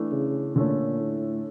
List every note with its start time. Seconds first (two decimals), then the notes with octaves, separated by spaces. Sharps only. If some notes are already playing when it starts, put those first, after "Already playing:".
Already playing: E3 A3 D4
0.12 C#3
0.55 A#2 D3 A3 C#4
1.00 A2